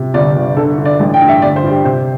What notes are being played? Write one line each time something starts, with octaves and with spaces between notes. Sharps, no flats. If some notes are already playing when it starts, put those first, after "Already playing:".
Already playing: C3
G1 D5
G1
D3 A4
D3
D5
A1
G5
G2
E5
G1 D5
C5
G2
G4
C3 C5